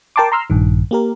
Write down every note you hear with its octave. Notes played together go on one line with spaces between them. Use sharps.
A#4 G5 A5 C6 D6
A#5 C6 E6 F6
A#1 G2 D#3
A#3 G4 A#4